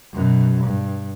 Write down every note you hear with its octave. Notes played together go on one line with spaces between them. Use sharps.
F#2 B2
G2